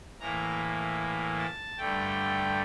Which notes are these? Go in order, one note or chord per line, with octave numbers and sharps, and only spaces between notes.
A2 E3 A#3 A#5
A5
G2 D3 A3 G5